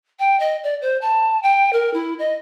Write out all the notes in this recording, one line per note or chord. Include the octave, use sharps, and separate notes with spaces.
G5
D#5
D5
C5
A5
G5
A#4
E4
D#5